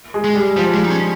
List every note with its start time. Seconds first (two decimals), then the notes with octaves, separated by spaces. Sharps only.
0.14 G#3
0.24 G#3
0.35 G3
0.57 F3 G3
0.74 G#3
0.85 D#4
0.90 C#4